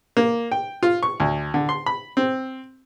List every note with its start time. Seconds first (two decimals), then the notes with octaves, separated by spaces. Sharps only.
0.17 A#3
0.52 G5
0.83 F4
1.03 C#6
1.20 D2
1.54 D3
1.69 C6
1.86 B5
2.17 C4